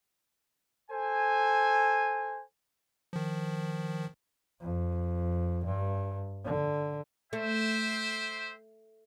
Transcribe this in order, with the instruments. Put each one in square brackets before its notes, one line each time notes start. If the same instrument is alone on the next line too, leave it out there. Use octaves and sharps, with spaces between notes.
[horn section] A4 C5 G#5
[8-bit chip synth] D#3 F3
[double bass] F2
G2
D3
[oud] A3 [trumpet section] C5 E5 G5